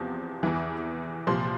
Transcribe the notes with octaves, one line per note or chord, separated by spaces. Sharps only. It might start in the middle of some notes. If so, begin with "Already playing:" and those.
Already playing: E2 C3 F3
E2 E3
C2 A#2 F3 C6